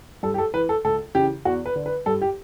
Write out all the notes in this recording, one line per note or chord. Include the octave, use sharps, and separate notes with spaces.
G2 A4
G4
A4
E3 B4
A4
C#2 A4
C#3 E3 G4
E2 F#4
B4
D3
B4
G2 A4
G4